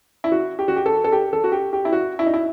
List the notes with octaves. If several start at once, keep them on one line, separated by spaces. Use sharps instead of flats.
E4
F#4
G4
F#4
G4
A4
A4
G4
A4
F#4
G4
G4
E4
F#4
E4
D#4
E4